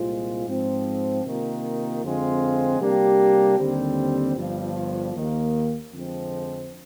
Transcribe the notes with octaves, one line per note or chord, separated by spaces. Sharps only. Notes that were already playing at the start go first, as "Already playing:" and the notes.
Already playing: C2 A#2 G#3 C4 F4
G#2 F3 C4
C3 D#3 A#3 F4
F2 D3 G#3 C4 F4
C3 G3 A#3 D4 G4
D#2 D3 G3 C4
G1 G2 F3
D#2 D#3 A#3
F2 D3 F3 G#3 C4